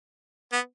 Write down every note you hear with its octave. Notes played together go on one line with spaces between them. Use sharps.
B3